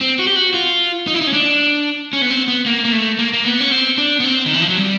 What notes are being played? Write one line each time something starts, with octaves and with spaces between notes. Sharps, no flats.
C4
F#4
G4
F#4
F4
D#4
E4
D#4
C#4
D4
C#4
B3
C4
B3
A#3
A#3
A3
A#3
A#3
B3
C#4
C4
D4
B3
C4
D#3
E3
F3
F#3
G3